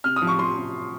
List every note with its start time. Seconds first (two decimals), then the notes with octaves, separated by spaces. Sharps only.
0.04 C3 F6
0.16 D#6
0.22 F3
0.27 C#6
0.39 F3 C6
0.57 C3